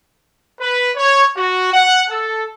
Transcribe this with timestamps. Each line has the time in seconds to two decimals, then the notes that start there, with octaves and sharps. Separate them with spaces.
0.60 B4
0.96 C#5
1.36 F#4
1.73 F#5
2.10 A4